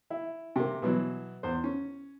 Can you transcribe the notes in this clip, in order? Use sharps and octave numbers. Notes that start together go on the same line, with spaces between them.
E4
C3 A#3
B2 E3 F#3
E2 C5
C#4